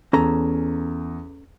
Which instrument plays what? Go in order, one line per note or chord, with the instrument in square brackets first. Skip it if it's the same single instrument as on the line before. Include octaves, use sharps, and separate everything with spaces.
[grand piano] E2 [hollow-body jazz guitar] C#4 A4 A#5